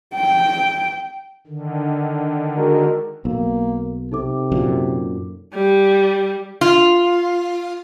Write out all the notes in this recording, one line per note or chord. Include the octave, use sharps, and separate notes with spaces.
G5
D3 D#3
G#3 F#4 A#4
B1 A#3 A#4
C3 D#4 A4 D6
F#2 A#2
G3
F4